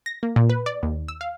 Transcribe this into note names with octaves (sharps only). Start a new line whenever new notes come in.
A#6
A#3
A#2
B4
D5
D#2
E6
F5